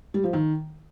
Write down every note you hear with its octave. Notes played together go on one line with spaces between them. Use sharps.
G3
F3
D#3